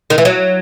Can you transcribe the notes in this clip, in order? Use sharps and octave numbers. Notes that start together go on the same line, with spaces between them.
D#3
E3
F#3